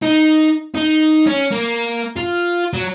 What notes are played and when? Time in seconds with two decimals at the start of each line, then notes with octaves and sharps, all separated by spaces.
0.02 D#4
0.75 D#4
1.27 C#4
1.52 A#3
2.16 F4
2.73 F#3